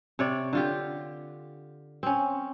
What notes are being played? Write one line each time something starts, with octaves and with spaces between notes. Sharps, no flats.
C3 C#5 D5
D3 F4 G4
C4 C#4